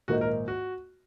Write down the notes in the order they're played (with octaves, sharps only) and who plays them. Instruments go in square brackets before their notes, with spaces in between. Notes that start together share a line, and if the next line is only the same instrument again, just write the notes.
[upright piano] A#1 G#2 D#3 A#3 D#4 [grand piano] F#4
[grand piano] A#4
F#4